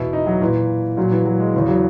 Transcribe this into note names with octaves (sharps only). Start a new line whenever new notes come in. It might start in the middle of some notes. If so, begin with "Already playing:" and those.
Already playing: E2 B2 E4
D#4
F#3
A#2 E3
A#2 F#3
E3
F#3
G#3
E2 C#3 E3
F#3